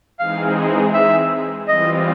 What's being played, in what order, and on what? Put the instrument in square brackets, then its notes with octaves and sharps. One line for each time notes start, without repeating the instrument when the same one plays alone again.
[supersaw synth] E3 G#3 C4 D#4 G#4 [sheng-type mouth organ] F5
[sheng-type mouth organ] E5
[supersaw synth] E3 G3 C4 F4 [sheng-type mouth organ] D#5